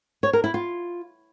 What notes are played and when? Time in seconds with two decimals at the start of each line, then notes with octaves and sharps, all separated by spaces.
0.23 C#5
0.33 A#4
0.44 E4
0.54 F4